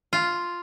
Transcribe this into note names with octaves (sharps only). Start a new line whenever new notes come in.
F4